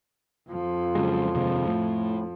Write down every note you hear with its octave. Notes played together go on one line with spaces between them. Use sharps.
F2 F3
C#3 F#3 G#3
D#2 C3 G#3
A2